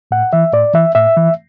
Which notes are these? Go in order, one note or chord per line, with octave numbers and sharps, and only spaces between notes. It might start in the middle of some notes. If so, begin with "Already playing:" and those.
A2 F#5
E3 E5
A2 D5
E3 E5
A2 E5
E3